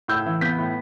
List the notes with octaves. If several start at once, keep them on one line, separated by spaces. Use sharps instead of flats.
A2 E6 G6
E3
B3 G6 B6
A2